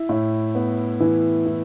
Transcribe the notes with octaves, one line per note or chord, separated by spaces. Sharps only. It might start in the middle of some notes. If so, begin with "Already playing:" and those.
Already playing: E4
A2
B3
E3
E4